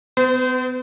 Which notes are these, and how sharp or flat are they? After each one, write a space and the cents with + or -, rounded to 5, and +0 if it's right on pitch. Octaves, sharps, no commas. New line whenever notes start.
B3 +40 C5 -30